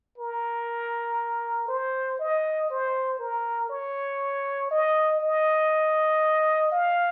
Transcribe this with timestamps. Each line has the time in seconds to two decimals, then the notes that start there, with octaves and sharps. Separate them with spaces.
0.18 A#4
1.68 C5
2.19 D#5
2.70 C5
3.19 A#4
3.70 C#5
4.71 D#5
5.21 D#5
6.72 F5